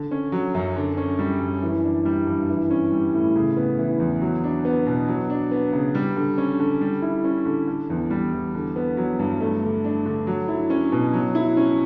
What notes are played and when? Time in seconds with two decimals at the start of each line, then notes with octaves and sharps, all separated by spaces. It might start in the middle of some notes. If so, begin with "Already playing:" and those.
Already playing: D3
0.11 C#4
0.32 F#3
0.54 F#2
0.76 D3
0.97 C#4
1.19 G3
1.40 F#2
1.62 E3
1.84 D4
2.05 G3
2.27 G2
2.49 E3
2.71 C#4
2.92 G3
3.13 A2
3.36 C#3
3.57 B3
3.79 E3
4.00 E2
4.21 F#3
4.44 D4
4.65 B3
4.86 B2
5.08 F#3
5.30 D4
5.51 B3
5.72 C#3
5.95 G3
6.16 D3
6.38 C#4
6.59 D3
6.81 G3
7.02 E4
7.24 C#4
7.45 D3
7.67 D3
7.90 E2
8.10 G3
8.32 E2
8.55 D3
8.76 B3
8.97 F#3
9.19 G2
9.40 A3
9.62 D3
9.84 D4
10.06 D3
10.27 F#3
10.48 E4
10.70 C#4
10.92 B2
11.14 F#3
11.35 E4
11.57 C#4